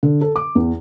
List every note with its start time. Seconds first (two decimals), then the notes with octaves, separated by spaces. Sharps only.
0.03 D3
0.21 A4
0.36 D6
0.55 E2